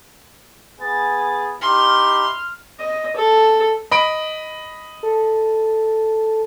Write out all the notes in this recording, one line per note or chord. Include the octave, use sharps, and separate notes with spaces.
B3 G#4 A6
D#4 E4 G4 C6 F6
D#5
A4
D#5 B5 D7
A4